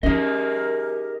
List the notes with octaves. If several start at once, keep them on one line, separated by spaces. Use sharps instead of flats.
C#4 D#4 G4 G#4 A#4 D#5